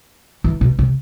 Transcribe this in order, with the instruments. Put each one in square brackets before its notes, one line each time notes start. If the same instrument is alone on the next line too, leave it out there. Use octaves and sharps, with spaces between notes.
[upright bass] E3
B2
C3